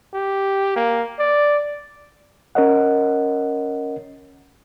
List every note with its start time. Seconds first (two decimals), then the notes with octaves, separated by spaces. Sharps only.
0.14 G4
0.76 A#3
1.19 D5
2.55 C#4 A#4 C#5 D#5 F#5